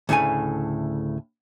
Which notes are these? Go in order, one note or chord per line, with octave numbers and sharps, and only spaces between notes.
D2 A2 C#3 A3 G#5